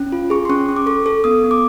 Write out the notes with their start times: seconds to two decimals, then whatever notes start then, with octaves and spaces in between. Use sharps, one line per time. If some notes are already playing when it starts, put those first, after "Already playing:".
Already playing: C#4
0.12 F4
0.30 G#4 C#6
0.45 C6
0.49 C#4 C#6
0.69 C#4
0.76 D6
0.86 A4 C#6
1.06 A4
1.24 B3 D#6
1.44 B3
1.51 D6